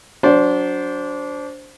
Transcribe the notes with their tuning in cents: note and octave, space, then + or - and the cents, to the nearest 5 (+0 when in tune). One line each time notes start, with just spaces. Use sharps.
F#3 +0 D4 -20 C5 +0